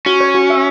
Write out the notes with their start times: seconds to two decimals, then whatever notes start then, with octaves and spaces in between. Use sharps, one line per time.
0.06 C#4 F#4
0.21 C#5
0.35 F#4
0.50 E5